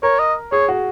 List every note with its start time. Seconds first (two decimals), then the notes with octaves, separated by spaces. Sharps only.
0.03 A#4 C#5
0.19 D#5
0.52 G#4 C#5
0.68 F#4